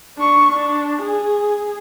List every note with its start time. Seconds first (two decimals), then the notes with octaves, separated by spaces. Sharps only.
0.18 D4 C#6
0.52 D4
1.02 G#4